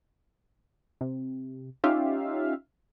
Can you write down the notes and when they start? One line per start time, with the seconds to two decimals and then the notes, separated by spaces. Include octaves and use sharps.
1.01 C3
1.84 C#4 D#4 F4 G4 E5 F5